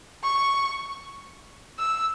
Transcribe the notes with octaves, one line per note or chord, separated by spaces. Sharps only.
C#6
E6